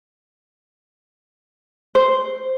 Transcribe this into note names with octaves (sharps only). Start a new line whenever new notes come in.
C5